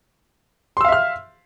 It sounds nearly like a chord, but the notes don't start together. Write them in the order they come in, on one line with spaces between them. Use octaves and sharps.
C6 E6 F5 E5 F6